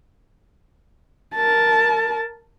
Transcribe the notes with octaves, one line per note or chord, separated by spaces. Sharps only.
A#4 A5